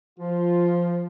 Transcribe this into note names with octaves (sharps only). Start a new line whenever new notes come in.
F3 F4